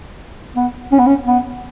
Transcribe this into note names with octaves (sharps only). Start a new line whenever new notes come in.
B3
C#4
B3
C#4
B3